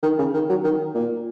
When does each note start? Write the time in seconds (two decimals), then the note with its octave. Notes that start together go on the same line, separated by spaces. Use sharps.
0.03 D#3
0.18 C#3
0.34 D#3
0.49 F#3
0.64 D#3
0.95 A#2